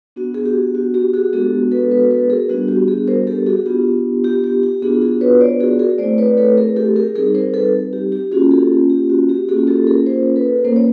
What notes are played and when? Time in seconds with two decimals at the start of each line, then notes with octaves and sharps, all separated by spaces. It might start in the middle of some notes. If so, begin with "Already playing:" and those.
0.16 B3 D4 F#4
0.34 G#4
0.46 G4
0.75 F#4
0.94 G4
1.13 F#4 G#4
1.33 G#3 B3 D4 F#4 G4 A4
1.71 A4 B4
1.91 A4 B4
2.10 A4 B4
2.30 G#4 A#4
2.49 G3 B3 D4 F#4
2.68 G4
2.88 F#4 G#4
3.08 A#4 C5
3.27 G4 A4
3.46 F#4 G#4
3.66 B3 D4 F4 G4
4.24 G4
4.44 G4
4.63 G4
4.82 B3 D4 F4 F#4 G#4
5.01 F#4 G#4
5.21 B4 C#5
5.41 C5 D5
5.60 F#4 G#4
5.79 G#4 A#4
5.98 A3 C4 E4 C5 D5
6.18 B4 C#5
6.37 A4 B4
6.57 G#4 A#4
6.76 G4 A4
6.96 G#4 A#4
7.15 G3 C4 D#4 G#4 A#4
7.35 A#4 C5
7.54 A4 B4
7.93 G4
8.12 G4
8.32 A#3 C#4 F4 F#4 G#4
8.51 G4 A4
8.90 G4
9.10 F#4
9.29 G4
9.49 A#3 C#4 F4 F#4 G#4
9.67 G4 A4
9.87 G#4 A#4
10.06 A#4 C5
10.36 A4 B4
10.65 A#3 C#4 F4 A#4 C5
10.76 C#5